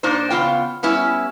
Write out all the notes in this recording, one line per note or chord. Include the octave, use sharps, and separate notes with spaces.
A#2 D4 D#4 C5
C#3 B3 F4 G5
G3 B3 C#4 E4